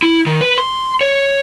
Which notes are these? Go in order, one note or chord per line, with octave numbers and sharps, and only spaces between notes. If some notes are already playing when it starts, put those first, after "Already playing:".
E4
D#3
B4
C6
C#5